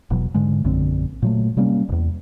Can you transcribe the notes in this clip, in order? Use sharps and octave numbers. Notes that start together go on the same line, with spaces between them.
E1 B2 F#3
G#2 D3 G#3
A#1 F#2 D3 C4
A#2 F#3 A3
C3 G3 A#3 C#4
D#1 E2